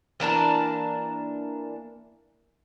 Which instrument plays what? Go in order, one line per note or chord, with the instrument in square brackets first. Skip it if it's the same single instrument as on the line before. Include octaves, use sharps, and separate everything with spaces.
[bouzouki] E3 A#3 D4 A5